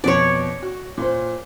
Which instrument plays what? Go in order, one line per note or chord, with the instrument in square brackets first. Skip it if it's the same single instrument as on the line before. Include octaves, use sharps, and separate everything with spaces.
[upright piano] F2 B2 [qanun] C#5 D5
[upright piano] F#4
A#2 C5